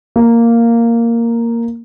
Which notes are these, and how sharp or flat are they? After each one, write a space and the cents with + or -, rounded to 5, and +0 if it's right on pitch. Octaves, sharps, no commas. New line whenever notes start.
A#3 -5